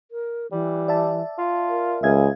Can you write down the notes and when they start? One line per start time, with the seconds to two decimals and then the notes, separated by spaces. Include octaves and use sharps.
0.11 A#4
0.52 E3 G3
0.88 D5 E5 A5
1.38 F4
1.69 A#4
2.03 C#2 G#4 E5 F5 G#6